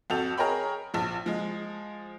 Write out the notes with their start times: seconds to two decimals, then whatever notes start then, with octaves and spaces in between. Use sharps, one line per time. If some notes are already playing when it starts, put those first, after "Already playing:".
0.10 F2 F#4 A4 G6 F7
0.38 G#4 A#4 C#5 G5 B5
0.94 A#1 F3
1.26 F3 G#3